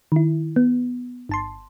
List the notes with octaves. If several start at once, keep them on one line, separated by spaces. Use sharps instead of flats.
D#3 E4
B3
G1 A5 C6